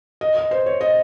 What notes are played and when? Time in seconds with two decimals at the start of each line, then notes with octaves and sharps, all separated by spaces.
0.21 D#5
0.37 D#5
0.51 C5
0.66 C#5
0.81 D#5